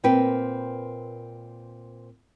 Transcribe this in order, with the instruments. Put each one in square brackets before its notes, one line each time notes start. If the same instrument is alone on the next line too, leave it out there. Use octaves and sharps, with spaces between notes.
[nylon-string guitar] A#2 C4 A#4 B4 G5